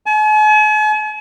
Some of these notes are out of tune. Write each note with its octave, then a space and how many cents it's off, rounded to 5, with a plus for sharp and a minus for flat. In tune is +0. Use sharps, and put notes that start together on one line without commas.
G#5 +45